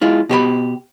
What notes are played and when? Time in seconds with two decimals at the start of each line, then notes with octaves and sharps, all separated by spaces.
0.01 G#3 E4 F4
0.29 B2 G4 C5 B5